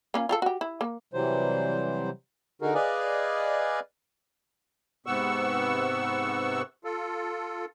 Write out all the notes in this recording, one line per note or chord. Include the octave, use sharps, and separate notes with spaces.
A#3 C#4 F4
F4 G4 A4
F#4 G4
E4
A#3
C3 E3 F#3 G3 C5
D3 D#4 F#4 G#4 A#4
G#4 B4 D5 D#5 F5 G#5
G#2 C3 B3 F#5 C#6 E6
F4 A4